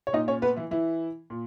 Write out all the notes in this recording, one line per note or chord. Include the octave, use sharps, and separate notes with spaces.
C#5
A#2 D#4 D#5
C#4 C#5
B3 B4
E3 E4
E3 E4
A#2